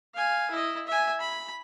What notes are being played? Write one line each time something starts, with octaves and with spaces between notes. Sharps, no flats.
F5 G#5
E4 D#5
E5 G#5
B5